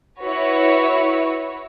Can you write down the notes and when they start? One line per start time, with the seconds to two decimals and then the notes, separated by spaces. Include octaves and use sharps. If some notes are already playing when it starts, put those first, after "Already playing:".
0.21 E4 F#4 B4 C#5